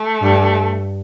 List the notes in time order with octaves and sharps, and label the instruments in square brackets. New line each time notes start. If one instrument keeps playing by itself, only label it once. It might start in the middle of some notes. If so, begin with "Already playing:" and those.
Already playing: [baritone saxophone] A3
[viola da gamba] G2